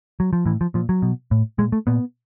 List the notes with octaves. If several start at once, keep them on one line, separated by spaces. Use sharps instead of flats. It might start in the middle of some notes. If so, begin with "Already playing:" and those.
F#3
F3
A2 E3
F3
A#2 F3
F#3
B2
A2
A#2 G#3
A3
A#2 B3